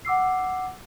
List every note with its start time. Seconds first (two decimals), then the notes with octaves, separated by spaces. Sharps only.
0.05 F#5 D6 E6 C7